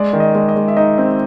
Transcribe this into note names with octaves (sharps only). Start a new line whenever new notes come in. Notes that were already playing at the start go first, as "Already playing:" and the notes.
Already playing: G#3 D5
D#3
D#5
G#3
D#5
G#3
E5
D#4 D#5
C4